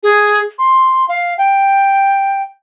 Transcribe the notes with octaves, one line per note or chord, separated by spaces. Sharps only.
G#4
C6
F5
G5